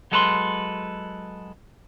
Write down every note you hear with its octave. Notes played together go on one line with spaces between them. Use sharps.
F#3 G#3 A4 B4 A5 C6